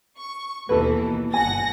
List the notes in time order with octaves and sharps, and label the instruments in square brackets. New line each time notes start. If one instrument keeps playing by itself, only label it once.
[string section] C#6
[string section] D#2 B2 E3 [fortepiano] A4 B4
[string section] G1 F#5 A#6 [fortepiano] G#5